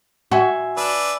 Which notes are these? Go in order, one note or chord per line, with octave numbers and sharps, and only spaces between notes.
F#4 E5 G#5 C6
D4 B4 E6